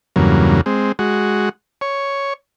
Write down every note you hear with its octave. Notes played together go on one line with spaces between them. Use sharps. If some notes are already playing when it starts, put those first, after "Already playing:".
E2 G2 C#3 F#3 A#3
G#3 C4
G#3 F#4
C#5